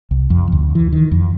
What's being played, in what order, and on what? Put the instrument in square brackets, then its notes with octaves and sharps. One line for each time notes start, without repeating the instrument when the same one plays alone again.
[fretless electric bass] C2
F2
D2
E3
D#3
F2